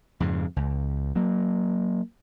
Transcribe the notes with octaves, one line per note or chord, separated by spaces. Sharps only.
F2 G#2 C#3
C#2
F#3 A#3